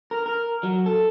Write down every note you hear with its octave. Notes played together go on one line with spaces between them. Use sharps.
A#4
A#4
F#3
A4